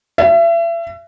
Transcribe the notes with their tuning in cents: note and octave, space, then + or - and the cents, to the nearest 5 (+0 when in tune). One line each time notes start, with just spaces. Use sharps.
E5 +35